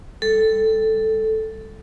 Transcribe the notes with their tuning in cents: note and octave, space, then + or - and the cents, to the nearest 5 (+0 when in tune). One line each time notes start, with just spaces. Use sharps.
G3 +10 A4 +0